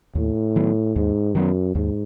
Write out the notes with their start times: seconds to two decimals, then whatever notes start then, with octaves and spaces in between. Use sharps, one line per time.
0.15 D#2 A2
0.56 D#3 F#3 B3
0.95 D#2 G#2
1.35 F#2 D#3 F#3 B3
1.75 D#2 G#2